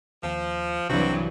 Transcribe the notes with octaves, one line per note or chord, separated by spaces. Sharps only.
D#2 F3
C2 G2 C3 E3 F#3 C4 F#4